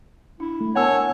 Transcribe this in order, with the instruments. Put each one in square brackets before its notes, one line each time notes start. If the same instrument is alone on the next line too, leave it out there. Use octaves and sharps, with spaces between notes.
[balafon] D4 [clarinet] E4
[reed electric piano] A3
[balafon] B3 A#4 A5 [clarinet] C#5 [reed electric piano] F#5 G#5 E6